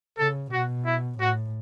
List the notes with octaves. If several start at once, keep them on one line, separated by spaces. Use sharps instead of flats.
C#3 A4
B2 F#4
E4
A2 F#4